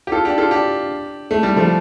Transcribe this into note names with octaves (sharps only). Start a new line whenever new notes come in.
G4
F4 A4
D4 G4
F4 A4
D4 G4
A3
G3
F3 A3